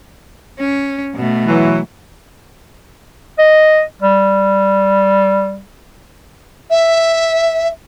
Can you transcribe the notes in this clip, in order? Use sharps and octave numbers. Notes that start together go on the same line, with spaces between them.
C#4
B2 A3
E3 F#3
D#5
G3
E5